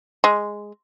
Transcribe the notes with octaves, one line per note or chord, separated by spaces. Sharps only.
G#3